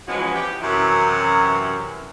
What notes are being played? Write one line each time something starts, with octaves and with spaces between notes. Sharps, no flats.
E3 F3 G#3 B3 C#4 F#4
G4
F#2 C3 E3